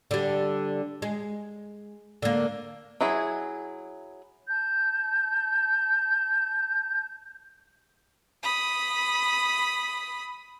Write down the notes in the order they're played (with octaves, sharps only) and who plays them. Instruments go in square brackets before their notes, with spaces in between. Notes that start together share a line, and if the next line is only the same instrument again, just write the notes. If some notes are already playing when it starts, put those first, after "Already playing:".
[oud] D3 G3
G#3
D3 A#3
[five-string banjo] F#3 E4 G#4
[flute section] A5 G6
[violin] B5 D#6